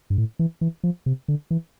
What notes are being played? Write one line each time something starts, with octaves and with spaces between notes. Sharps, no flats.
G2
A2
E3
E3
F3
C3
D3
E3